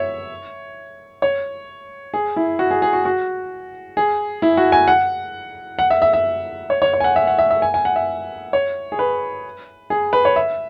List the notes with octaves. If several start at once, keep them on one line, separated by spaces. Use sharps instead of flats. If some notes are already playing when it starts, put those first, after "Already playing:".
Already playing: C#5 E5
C#5
G#4
E4
F#4
G#4
G#4
F#4
F#4
G#4
E4
F#4
G#5
F#5
F#5
E5
E5
E5
C#5
C#5
C#5
G#5
F#5
E5
F#5
E5
E5
G#5
G#5
F#5
E5
C#5
G#4
B4
G#4
B4
C#5
E5